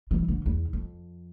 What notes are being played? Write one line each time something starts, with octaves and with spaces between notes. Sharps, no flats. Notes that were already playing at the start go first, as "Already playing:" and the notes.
E3
D3
E2
F2